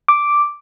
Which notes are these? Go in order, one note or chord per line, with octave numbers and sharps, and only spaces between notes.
D6